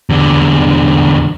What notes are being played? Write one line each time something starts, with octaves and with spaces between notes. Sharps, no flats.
E2 D3